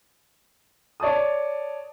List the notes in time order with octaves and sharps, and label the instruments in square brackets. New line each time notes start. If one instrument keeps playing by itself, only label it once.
[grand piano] C#5 D5 A5 D#6